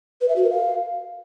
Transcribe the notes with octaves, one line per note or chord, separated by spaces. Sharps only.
B4
E5
F#4
A#4
F5